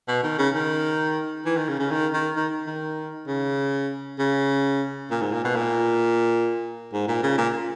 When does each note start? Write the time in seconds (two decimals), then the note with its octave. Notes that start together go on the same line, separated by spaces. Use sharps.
0.08 B2
0.23 D#3
0.38 C#3
0.54 D#3
1.45 E3
1.57 D#3
1.69 C#3
1.79 C#3
1.91 D#3
2.14 D#3
2.36 D#3
2.67 D#3
3.27 C#3
4.19 C#3
5.11 A#2
5.21 G#2
5.33 A#2
5.44 B2
5.56 A#2
6.93 G#2
7.08 A#2
7.23 C#3
7.38 A#2